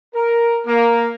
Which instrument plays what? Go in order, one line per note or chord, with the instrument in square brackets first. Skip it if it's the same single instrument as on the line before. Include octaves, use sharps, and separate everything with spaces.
[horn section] A#4
A#3